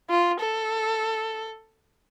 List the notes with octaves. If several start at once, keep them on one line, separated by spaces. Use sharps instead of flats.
F4
A4